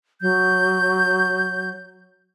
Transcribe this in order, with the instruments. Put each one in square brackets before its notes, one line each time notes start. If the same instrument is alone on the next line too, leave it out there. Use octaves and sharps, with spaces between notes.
[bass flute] F#3 [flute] G6